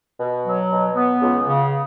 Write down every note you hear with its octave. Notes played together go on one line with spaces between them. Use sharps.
B2
F#3
B2
B3
C#2
C#3